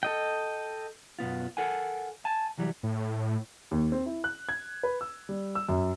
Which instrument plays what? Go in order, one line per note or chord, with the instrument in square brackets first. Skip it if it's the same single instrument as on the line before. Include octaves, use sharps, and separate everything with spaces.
[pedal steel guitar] A4 D#5 G5
[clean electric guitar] F#2 B2 B3 F4
A4 A#4 F#5 G#5
G#5 A5
C2 E3 F#3 G3
[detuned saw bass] A2
[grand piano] D#2
C4
E4
F#6
G#6
B4
E6
G3
E6
F#2